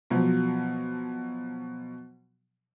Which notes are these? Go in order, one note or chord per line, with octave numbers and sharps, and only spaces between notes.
B2 F3 F#3